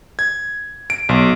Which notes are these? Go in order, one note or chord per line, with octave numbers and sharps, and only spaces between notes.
G#6
D7
B1